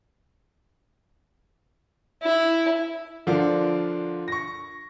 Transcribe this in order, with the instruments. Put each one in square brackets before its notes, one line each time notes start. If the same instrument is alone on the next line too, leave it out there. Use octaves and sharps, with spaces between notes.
[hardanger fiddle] E4
[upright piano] D3 F3 D4 F4 A#4
C#6 A#6